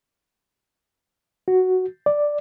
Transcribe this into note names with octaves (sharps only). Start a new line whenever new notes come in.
F#4
D5